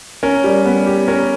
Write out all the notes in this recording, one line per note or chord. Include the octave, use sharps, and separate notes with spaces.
C#4 A#4
G3
B3
G4
C#4 A#4